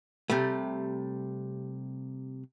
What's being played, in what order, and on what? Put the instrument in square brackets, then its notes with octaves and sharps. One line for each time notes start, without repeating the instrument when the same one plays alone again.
[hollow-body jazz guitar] C3 G3 A3